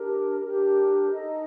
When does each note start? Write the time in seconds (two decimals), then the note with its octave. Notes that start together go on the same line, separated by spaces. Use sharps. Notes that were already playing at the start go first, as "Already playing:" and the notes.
Already playing: D4 G4 A#4
0.40 D4 G4 A#4
1.11 D#4 A4 D#5